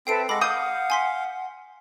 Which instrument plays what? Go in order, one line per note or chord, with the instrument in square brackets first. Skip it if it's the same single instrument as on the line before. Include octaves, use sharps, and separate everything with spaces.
[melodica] C4 [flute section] A4 B4 E5 [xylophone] G5 C7 D7
[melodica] G#3 A4 D6 [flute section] F#5 [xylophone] B5 A#6
[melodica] F5 [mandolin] D#6 G6
[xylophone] G#5 C6 B6